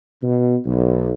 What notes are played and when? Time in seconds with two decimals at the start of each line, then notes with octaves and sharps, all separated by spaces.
0.22 B2
0.65 B1